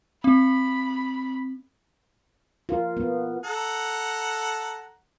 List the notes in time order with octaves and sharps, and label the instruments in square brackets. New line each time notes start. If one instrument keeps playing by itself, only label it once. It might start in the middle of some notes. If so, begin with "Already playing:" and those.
[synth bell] C4 [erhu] B5
[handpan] F4 A#4
B3
[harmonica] A4 F#5 A#5